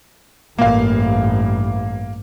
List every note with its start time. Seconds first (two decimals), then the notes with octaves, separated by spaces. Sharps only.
0.58 A1 G2 A#3 F5